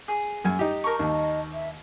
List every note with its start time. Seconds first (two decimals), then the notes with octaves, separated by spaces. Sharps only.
0.08 G#4
0.45 F#2 G#5
0.59 D#4 G4
0.84 A#4 A5 A#5 C#6
0.99 D#2 D#5 A5
1.52 E5